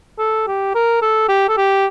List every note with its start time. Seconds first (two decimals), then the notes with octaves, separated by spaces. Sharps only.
0.18 A4
0.47 G4
0.75 A#4
1.02 A4
1.29 G4
1.49 A4
1.57 G4